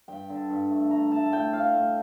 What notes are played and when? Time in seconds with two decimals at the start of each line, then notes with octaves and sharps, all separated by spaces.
0.08 G2 G5
0.30 D3
0.49 G2
0.70 A3
0.91 A3 A#5
1.12 A3 A5
1.26 A5
1.32 A2 G5
1.53 A2 F5
1.74 A2